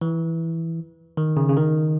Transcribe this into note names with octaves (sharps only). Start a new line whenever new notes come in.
E3
D#3
C#3
C#3
D#3